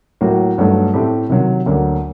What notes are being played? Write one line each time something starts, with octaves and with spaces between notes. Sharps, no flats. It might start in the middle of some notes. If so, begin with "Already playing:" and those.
A2 F#3 A#3 F#4
G2 F#3 A3 D#4
A2 A3 C4 G4
C3 D#3 F#3
D2 D3 F#3 A#3